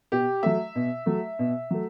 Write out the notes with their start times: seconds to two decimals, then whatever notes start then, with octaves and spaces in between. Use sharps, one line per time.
0.12 B2 G4
0.43 F#3 A3 E5
0.75 B2
1.06 F#3 A3
1.39 B2
1.71 F#3 A3